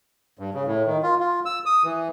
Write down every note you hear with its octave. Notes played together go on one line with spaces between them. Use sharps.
G2
C#3
A2
D#3
F4
F4
E6
D#6
E3